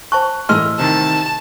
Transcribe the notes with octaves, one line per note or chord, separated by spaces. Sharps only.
C5 A5 C#6 F#6
A2 E3 D#5 C6 E6 F6
C3 D#3 A5